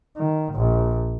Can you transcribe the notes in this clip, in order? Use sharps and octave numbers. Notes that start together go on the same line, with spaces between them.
D#3
A#1